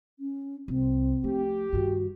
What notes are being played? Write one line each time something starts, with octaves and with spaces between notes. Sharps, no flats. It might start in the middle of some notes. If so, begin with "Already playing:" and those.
C#4
C2 C4
F3 A3 G4
G2 D#3 F#4